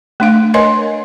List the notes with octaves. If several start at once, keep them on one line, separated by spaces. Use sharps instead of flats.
A3 D4 F5
A#4 B4 C#5 D#5 G#5 C6